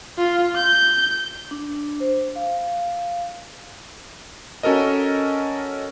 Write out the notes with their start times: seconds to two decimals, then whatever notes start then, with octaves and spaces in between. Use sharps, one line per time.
0.18 F4
0.56 G6
1.51 D4
2.00 C5
2.36 F5
4.63 C#4 F#4 A4 A#4 D#5